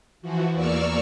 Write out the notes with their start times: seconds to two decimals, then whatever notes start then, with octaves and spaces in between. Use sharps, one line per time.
0.22 E3 F3 F#4
0.53 E2 A#3 D5 C#6 E6 F6